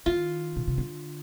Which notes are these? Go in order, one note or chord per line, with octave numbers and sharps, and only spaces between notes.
D#3 F4
B2
C3
D3